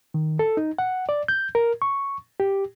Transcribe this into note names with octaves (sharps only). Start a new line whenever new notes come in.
D#3
A4
D#4
F#5
D5
G6
A#4
C#6
G4